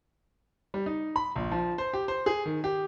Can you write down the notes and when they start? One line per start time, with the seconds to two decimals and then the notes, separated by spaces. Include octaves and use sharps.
0.74 G3
0.86 D#4
1.16 B5
1.36 A#1
1.51 F3
1.78 C5
1.93 G4
2.08 C5
2.26 G#4
2.46 D#3
2.64 G4